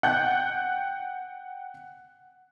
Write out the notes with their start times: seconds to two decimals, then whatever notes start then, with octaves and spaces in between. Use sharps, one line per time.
0.03 F#5 G5 F#6 G6